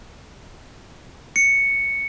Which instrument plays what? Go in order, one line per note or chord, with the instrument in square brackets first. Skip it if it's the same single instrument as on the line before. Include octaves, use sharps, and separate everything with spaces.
[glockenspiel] C#7